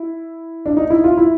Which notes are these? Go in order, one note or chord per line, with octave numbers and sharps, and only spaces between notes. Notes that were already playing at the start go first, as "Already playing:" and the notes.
Already playing: E4
D4
D#4
E4
F4
E4